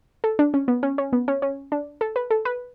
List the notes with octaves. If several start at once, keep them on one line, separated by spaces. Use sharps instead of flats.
A4
D4
C#4
B3
C#4
C#4
B3
C#4
C#4
D4
A4
B4
A4
B4